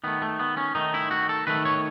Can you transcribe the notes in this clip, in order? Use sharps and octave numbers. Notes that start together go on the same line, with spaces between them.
D#3 A3 B3
A3
B3
C#4
D#3 A3 D#4
E4
F#4
A4
D#3 A3 B4
C#5